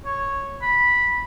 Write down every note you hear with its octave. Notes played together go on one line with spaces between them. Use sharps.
C#5
B5